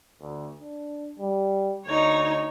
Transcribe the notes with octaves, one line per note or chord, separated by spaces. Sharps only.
D2
D4
G3
D2 D#4 C#5